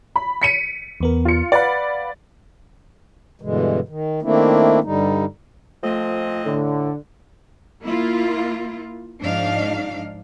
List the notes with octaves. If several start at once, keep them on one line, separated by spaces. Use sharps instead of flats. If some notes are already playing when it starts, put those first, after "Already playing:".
B5
B6 C#7 D#7
E2 B3 A#4
F4 C#7
B4 D5 F5 F#5 B5
G2 B2 D3 E3 G#3
D#3
D#3 A3 A#3 C4 D4 E4
G2 D3 G3 D#4
A#2 F3 A3 C4 A4 D#5
A2 D3
A#3 E4 F4
G#2 F3 D4 D#4 F5